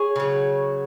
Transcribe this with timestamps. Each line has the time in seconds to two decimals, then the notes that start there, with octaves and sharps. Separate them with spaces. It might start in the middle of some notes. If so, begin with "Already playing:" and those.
Already playing: G#4 C#5
0.16 C#3 F#3